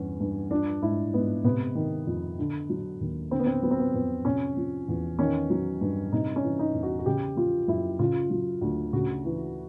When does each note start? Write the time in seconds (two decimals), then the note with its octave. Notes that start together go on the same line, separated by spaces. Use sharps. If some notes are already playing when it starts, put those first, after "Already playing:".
Already playing: E2 G2 C#4
0.20 G2
0.51 F3 D4
0.82 G#2 E4
1.14 G#2 B3
1.44 C3 B3
1.75 D#3
2.07 F2
2.39 D3
2.70 F#3
3.01 D#2
3.31 D3 C4
3.39 B3
3.46 C4
3.62 F#3 B3
3.71 C4
3.79 B3
3.94 F2 B3
4.25 C3 C#4
4.57 F3
4.88 E2
5.19 D#3 C#4
5.50 F#3
5.81 G2
6.12 C3 D#4
6.36 C#4
6.43 E3
6.59 D#4
6.74 E2
6.83 F#4
6.99 F#4
7.06 C#3 G4
7.37 F3 F4
7.68 F#2 E4
7.99 C#3 F4
8.30 F#3
8.61 D2
8.93 C#3 F#4
9.25 E3